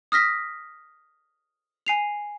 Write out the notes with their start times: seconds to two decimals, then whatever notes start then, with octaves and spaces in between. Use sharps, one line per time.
0.12 D#6 F6 A#6 B6
1.86 G#5 C7 F7